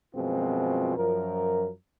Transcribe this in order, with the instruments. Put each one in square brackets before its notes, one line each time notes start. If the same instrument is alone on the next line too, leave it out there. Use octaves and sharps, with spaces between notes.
[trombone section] F#2 B2 F3 G#3 C4 F4
F#2 F3 A#4